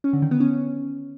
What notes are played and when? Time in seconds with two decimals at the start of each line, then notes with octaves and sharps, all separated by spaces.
0.04 C#4
0.13 D3
0.22 D#3
0.31 B3
0.40 C#4